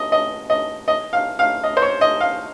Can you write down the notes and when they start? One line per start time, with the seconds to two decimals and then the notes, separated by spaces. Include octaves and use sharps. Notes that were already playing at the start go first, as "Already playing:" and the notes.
Already playing: D#5
0.12 D#5
0.50 D#5
0.88 D#5
1.13 F5
1.39 F5
1.64 D#5
1.77 C5
1.82 C#5
2.01 D#5
2.20 F5